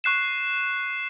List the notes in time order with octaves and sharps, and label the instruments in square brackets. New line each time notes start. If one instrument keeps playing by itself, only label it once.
[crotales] C#6 F#6 C7 E7